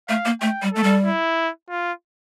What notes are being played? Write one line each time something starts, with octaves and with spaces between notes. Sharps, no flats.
A3 F5
A#3
A3 G5
G3
A3 A4
G3
E4
F4